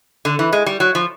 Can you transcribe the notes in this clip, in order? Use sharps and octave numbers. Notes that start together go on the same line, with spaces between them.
D3
E3
G#3
G3
F#3
F3